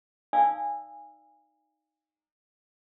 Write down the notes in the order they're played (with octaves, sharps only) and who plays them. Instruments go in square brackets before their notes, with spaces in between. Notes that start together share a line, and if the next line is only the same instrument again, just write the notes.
[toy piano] D#4 D5 F5 G#5 D#6 E6